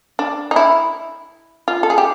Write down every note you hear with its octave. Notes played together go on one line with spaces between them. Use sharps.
D4
D#4
E4
F4
A4
G#4
G4